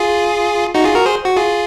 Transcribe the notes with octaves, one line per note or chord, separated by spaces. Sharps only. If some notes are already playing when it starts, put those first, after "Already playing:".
Already playing: F4 G#4
D#4 F#4
F4 G#4
F#4 A#4
G#4 C5
F#4
F4 G#4